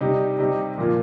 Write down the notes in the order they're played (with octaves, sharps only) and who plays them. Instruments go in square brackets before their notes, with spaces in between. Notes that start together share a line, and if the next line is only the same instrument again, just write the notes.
[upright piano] C3 G3 D#4 G4
C3 G3 D#4 G4
A#2 F3 A#3 F4